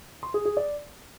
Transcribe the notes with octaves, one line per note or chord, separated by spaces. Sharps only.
C6
G#4
G#4
D5